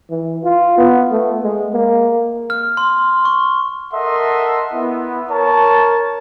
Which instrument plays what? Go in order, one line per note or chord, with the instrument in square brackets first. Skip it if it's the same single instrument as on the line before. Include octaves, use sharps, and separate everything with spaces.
[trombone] E3
F4
B3
A3
G#3
A#3
[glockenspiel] F6
C6
C#6
[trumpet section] A4 A#4 D#5 E5 F#5 C6
B3 E4
A#4 C#5 A5